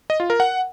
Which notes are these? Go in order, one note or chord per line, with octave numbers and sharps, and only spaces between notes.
D#5
F4
A#4
F#5